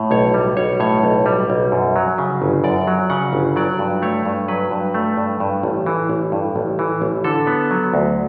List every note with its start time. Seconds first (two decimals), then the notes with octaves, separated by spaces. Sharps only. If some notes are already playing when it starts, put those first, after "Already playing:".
Already playing: A2
0.11 B1 C#5
0.34 G3
0.57 B1 C#5
0.80 A2 C#5
1.03 B1
1.26 G3
1.50 B1
1.72 F#2
1.96 F#3
2.18 C#3
2.42 G1
2.64 F#2 D5
2.87 F#3
3.10 C#3 F#5
3.33 G1
3.56 F#3 D5
3.79 G2
4.02 A3 C#5
4.26 G2
4.48 F#3 B4
4.71 G2
4.94 A3
5.17 G2
5.40 G2
5.63 A1
5.86 E3
6.10 A1
6.32 G2
6.56 A1
6.79 E3
7.02 A1
7.24 D3 A4
7.47 B3
7.71 F#3
7.94 D2